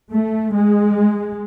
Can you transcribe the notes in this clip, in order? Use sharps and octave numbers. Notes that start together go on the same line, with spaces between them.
A3
G#3